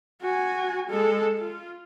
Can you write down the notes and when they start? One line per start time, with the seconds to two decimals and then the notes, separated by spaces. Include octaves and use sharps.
0.22 F#4 G#5
0.90 G#3 A4
1.37 F4